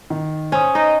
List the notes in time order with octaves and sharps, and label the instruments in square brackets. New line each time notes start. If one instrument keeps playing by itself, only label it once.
[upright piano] D#3
[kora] C#4 [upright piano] C5 D#6
[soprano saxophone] D#4 [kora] D#5